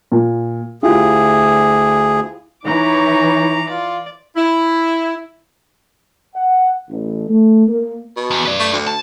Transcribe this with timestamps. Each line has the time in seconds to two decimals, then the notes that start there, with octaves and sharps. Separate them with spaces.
0.12 A#2
0.83 D2 E4 F4 G4 G#4
2.65 E3 D#4 C#5 A#5 D6
3.69 F4 D5
4.37 E4
6.35 F#5
6.90 A1
7.29 A3
7.68 A#3
8.17 B2
8.31 E2
8.45 B4 D5
8.60 A3
8.72 D2
8.87 A5